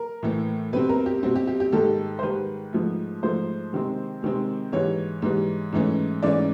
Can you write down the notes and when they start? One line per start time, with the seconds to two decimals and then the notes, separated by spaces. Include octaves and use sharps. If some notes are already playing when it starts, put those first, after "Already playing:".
Already playing: A#4
0.23 A2 E3 A3
0.73 B2 G3 C4 B4
0.89 A#4
1.06 G4
1.23 B2 G3 C4 F#4
1.36 G4
1.47 G4
1.60 G4
1.72 G#2 D#3 G3 A4
2.19 C5
2.23 G#2 D#3 G3 B4
2.73 G#2 F3 A3
3.22 G#2 F3 A3 C5
3.73 C3 D#3 G#3 C4
4.22 C3 D#3 G#3 C4
4.72 G#2 E3 G3 C#5
5.22 G#2 E3 G3
5.73 G#2 E3 A3 C#4
6.23 G#2 E3 A3 C#4 D5